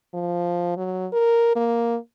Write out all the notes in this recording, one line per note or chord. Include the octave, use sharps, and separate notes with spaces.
F3
F#3
A#4
A#3